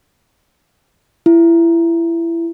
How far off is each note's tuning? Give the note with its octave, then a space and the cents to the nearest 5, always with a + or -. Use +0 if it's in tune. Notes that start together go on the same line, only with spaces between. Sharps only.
E4 +25